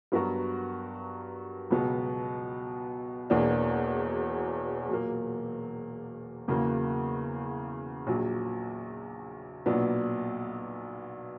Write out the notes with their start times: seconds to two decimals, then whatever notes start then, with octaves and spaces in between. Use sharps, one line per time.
0.12 G2 F#3 B3 F#4 A#4
1.71 C#2 B2 F#3 B3
3.30 E1 E2 B2 A#3 D4
4.89 A#2 F#3 A#3
6.48 E2 C#3 F#3 A#3
8.07 A#1 A#2 F#3
9.66 B1 A#2 F#3 B3 D4